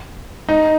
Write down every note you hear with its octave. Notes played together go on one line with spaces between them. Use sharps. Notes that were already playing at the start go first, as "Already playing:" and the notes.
D#4